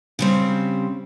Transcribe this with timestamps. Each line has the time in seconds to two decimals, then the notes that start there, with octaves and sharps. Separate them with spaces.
0.19 C#3 G3 C4